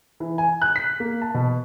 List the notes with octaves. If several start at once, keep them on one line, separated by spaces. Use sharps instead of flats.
E3
G#5
F#6
B6
A#3
A5
B2